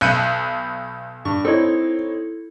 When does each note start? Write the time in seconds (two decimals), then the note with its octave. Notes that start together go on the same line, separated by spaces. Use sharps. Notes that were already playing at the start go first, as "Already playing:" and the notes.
0.01 B1 B5 F#6 G6 C#7 D#7
1.25 G2 C#6
1.45 C4 D#4 E4 A4 C#5